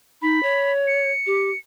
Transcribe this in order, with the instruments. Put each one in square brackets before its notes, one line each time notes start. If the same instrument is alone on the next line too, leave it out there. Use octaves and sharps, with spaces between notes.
[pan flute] D#4 [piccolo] B5
[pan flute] C#5
[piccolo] C#7
[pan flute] G4